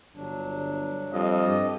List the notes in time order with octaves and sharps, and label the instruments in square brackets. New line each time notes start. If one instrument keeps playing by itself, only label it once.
[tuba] G1 [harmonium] F#3 D4
[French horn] F2 [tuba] G3 [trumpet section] A4 D#5
[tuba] G2 [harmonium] G4